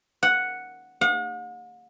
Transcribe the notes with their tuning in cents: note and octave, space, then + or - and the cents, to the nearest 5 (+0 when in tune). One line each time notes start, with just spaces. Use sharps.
F#5 +0
F#5 -45